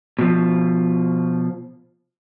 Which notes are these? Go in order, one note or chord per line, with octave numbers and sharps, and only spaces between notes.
B2 F3